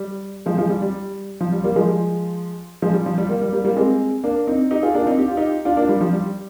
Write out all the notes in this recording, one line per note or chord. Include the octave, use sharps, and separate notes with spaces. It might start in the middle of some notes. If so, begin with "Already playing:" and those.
Already playing: G3
F3 G#3
F3 G#3
G3
G3
F3
G3
G3 A#3
F3 G#3
F3 G#3
G3
F3
G3
G3 A#3
G3
G3 A#3
G3 A#3
G#3 C4
A#3 D4
C4 D#4
D#4 G4
F4 G#4
A#3 D4
C4 D#4
G4
F4
D#4 G4
D4 F4
A#3 D4
G3
F3
G3